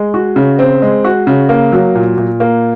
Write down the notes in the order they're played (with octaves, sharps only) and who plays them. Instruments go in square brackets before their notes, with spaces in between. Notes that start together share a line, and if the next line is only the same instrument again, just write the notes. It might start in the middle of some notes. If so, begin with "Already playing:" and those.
Already playing: [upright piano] G#3
F#4
C#3
C4
G#3
F#4
C#3
A#3
F#3
A#2
A#2
A#3